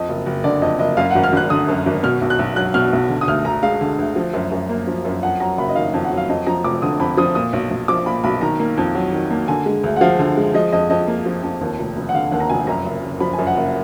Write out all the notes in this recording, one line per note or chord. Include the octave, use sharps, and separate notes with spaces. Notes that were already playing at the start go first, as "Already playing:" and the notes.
Already playing: F2 D#5
F#1
F#1
D3 D5
F2 D#5
F#1 D#5
F#2 F5
F#5
G#1
F6
G#1 F#6
D3 D#6
F#2
G#1
B2 F6
B1
F#6
B1
F#3 F#6
B2 F6
B1
D3
D#6
D2 F6
D2 A#5
G#3 F5
D3
D2
F3
F#2
F#2
A#3
F3
F#2
F2 F#5
F#3 A#5
F#1 B5
D#5
D#3 F5
F2
F#5
F#3
F5
F2 D#5
F3 A#5
F1 D6
D3 D#6
F2 B5
F3 D#6
A#2 D#6
B1
B1
F3 D6
A#2 B5
B1 B5
D#3 A#5
A#3
F2
F#3
D#3
A#3
D3 G#5
G#3
D2
F#5
F3 F5
D3
G#3
F3 D#5
F2 D#5
F2 D#5
A#3
F3
F2
D#2
F1
F1
F#5
D3 F5
D#2 F#5
A#5
F1 G#5
F#2 A#5
F#1
F#1
F3 B5
G#5
F#2
F#5
F#1